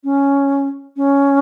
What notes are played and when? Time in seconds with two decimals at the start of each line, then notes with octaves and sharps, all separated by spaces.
0.04 C#4
0.97 C#4